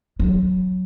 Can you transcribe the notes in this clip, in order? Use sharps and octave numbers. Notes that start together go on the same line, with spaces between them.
F#3